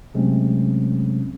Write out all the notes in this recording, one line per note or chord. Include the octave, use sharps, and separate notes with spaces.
C3 F#3 G#3 A3 C4 C#4